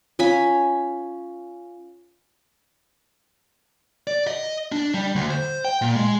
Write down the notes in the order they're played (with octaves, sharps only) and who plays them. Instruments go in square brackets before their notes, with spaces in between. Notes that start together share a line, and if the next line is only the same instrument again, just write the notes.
[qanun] C#4 G#5 B5 [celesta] F4 F5
[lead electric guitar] D5
D#5
D4
G3
D2
C5
G5
A#2
G#3